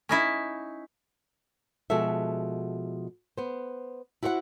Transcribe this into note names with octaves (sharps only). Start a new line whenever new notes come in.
C#4 D#4 E4
B2 F3 G#3 F#4 A4 E5
B3 C5
E4 F#4 C5 D5 F#5